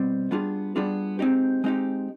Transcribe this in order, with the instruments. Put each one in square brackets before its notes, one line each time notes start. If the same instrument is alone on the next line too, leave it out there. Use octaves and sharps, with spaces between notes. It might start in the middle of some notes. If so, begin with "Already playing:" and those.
Already playing: [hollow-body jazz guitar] B2 G3 C4
G3 B3 D4 F4 G#4
G3 B3 D4 F4 G#4
G#3 C4 D#4 G4
G#3 C4 D#4 G4